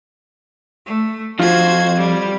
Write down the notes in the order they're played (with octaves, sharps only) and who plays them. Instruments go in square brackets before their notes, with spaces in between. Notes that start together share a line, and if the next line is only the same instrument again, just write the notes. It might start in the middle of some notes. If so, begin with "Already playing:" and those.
[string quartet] A3
[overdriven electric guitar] F2 [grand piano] F4 [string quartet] F#4 C5 G#6
[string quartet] G3